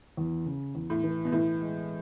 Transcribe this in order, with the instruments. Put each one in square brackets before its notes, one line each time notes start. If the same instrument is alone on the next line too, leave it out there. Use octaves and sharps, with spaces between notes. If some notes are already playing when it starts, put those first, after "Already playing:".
[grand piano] E2
C#3
E2
[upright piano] A2
[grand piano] E3
[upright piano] B2
[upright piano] A2 [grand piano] E3
[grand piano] G#3